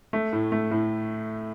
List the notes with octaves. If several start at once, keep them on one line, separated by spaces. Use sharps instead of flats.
A3
A2
A3
A2